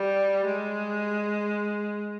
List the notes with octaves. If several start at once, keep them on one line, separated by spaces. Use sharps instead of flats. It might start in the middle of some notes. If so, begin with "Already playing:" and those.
Already playing: G3
G#3